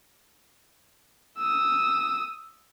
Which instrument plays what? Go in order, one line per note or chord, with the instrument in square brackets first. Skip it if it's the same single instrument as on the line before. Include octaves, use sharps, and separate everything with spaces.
[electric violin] D#6 E6